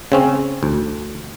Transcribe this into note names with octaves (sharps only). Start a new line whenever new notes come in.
C#3 C4 C#4
D2